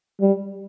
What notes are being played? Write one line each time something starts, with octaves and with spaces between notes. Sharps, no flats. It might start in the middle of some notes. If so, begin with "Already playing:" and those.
G3